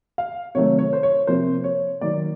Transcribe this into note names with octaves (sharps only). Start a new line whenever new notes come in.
F5
C3 D#3 F#3 A3 C#5
C#5
C5
C#5
C3 F3 A#3 C5
C#5
D#3 F#3 A#3 D5